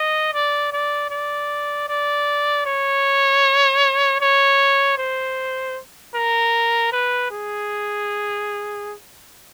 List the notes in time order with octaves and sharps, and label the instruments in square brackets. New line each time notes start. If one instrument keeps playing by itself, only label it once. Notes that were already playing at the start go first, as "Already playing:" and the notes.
Already playing: [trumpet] D#5
D5
D5
D5
D5
C#5
C#5
C5
A#4
B4
G#4